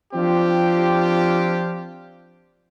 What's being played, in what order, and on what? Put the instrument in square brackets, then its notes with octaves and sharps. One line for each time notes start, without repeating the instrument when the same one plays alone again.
[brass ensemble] F3 C4 D4 F4 G4